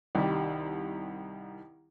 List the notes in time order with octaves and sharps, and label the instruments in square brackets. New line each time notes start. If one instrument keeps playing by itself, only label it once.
[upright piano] C2 [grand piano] D#3 G3